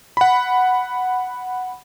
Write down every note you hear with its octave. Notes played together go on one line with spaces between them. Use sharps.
F#5 B5